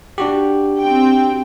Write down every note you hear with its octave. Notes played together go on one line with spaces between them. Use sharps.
D4 F#4 G4
C4 G5